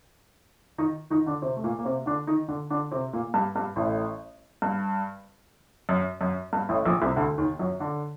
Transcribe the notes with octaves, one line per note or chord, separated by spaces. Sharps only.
D#3 D#4
D#3 D#4
D3 D4
C3 C4
A3
A#2 A#3
A#3
C3 C4
D3 D4
D#3 D#4
D3 D4
D3 D4
C3 C4
A#2 A#3
G2 G3
G2 G3
A1 A2
G2
F#2
F#2
G2
A1 A2
A#1 A#2
C2 C3
D2 D3
D#2 D#3
F#2 F#3
D3 D4